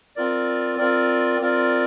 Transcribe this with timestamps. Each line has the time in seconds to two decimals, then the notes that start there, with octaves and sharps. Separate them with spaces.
0.16 C4 F4 A#4 D5
0.78 C4 F4 A#4 D5
1.40 C4 F4 A#4 D5